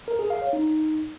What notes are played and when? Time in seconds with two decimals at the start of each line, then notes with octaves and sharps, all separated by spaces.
0.08 A#4
0.19 G#4
0.30 F5
0.42 C#5
0.53 D#4